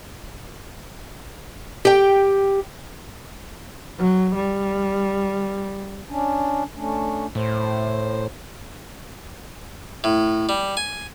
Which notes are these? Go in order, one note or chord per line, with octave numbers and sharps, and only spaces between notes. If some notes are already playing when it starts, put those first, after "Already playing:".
G4 G5
F#3
G3
C#4 D4
A3 C#4 D4
A2 C5
A2
G3
G#5